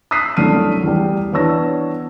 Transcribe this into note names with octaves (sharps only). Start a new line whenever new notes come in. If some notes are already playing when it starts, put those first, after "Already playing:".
D#6 E6 F#6 B6 C7
C2 F#2 A3 D4 F6 D#7
E2 G3
E3 B3 D4 C#5 E6 A#6